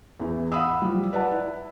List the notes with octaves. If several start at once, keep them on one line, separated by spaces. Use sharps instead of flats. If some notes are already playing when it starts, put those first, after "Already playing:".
E2 E3
F5 F#5 B5 D#6 E6
F3 G3
B4 D5 F#5 A5
E4